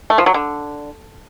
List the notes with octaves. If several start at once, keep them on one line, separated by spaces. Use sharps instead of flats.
A3
F3
F#3
D3